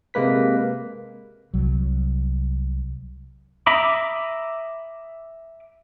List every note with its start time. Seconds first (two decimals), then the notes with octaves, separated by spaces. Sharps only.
0.14 C3 G#3 A#3 B4 B6
1.54 C2 F#3
3.66 E5 A#5 B5 D6 D#6